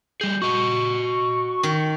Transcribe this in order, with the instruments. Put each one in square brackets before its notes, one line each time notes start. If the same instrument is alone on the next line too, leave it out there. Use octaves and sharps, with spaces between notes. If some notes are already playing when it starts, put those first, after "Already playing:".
[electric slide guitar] G3 G#4 [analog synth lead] G6
[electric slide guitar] F#4 D#5 [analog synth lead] C#6
[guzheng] D#3